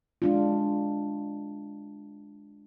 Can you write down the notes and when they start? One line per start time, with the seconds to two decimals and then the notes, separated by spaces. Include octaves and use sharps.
0.22 G#3 D4 F4